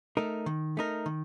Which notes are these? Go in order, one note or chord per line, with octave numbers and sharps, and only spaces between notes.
A3 D#4 A#4
D#3
A3 D#4 A#4
D#3